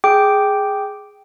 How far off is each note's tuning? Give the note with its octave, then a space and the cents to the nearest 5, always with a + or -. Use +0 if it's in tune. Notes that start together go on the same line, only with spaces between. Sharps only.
G#4 +0 G5 -5 D6 +0